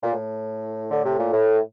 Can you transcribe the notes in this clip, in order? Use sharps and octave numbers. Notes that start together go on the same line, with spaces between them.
A#2
A2
D3
C3
A#2
A2